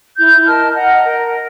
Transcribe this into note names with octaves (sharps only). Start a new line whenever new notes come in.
E4 G6
A#4 D#5 A5 F6
D#5 F#5 A#5
A#4